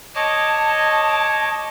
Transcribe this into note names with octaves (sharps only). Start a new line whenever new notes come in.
C#5 D#5 A5 D6